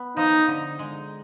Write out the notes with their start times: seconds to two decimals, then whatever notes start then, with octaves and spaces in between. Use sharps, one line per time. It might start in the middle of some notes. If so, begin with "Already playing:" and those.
Already playing: B3
0.17 F3 D#4
0.48 D3
0.79 G#3